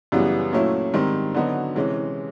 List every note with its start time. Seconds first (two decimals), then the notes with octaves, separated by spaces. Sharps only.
0.12 F#2 C#3 E3 G3 B3
0.52 A#2 F#3 A3 C#4 E4
0.94 G#2 D#3 G3 C4
1.34 D3 F#3 B3 D#4 F#4
1.75 C3 E3 G#3 C#4